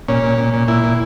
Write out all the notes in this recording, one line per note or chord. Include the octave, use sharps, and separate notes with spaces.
A#2 C#4
A#2
A#2
A#2
A#2 E4
A#2